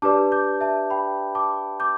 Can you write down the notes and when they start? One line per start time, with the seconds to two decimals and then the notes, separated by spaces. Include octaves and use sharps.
0.02 D4 G4 B4 D5 A5 D6
0.32 D6 G6
0.61 E5 A5
0.90 G5 B5
1.35 A5 D6
1.80 D6 G6